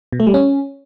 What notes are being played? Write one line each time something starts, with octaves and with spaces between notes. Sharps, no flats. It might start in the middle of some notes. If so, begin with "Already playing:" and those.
B2
A3
G3
C#4